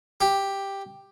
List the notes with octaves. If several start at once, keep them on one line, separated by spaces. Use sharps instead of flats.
G4